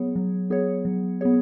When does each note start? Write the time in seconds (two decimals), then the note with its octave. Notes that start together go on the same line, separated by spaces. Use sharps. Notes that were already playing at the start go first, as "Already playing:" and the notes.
Already playing: F#3 B3 G#4 C#5
0.16 F#3
0.50 B3 G#4 C#5
0.85 F#3
1.21 B3 G#4 C#5